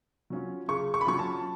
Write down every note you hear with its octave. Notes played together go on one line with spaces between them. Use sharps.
F#3 C#4 F4
C#3 C#6
C#6
B5
F#3 C#4 F4 C#6
A5